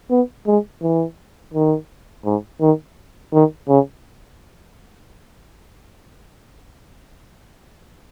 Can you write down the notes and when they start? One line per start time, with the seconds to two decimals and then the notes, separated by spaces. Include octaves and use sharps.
0.10 B3
0.47 G#3
0.82 E3
1.54 D#3
2.25 G#2
2.61 D#3
3.33 D#3
3.68 C#3